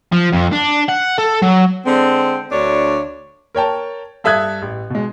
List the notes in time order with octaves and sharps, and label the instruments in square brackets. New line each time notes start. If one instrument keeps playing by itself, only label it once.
[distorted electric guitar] F3
F2
D4
F#5
A4
F#3
[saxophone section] D3 G#3 C4
D2 D4 C#5
[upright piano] A#4 C#5 G5 A5
G2 A4 E5 D#6 F#6 G#6
A1
B2 G#3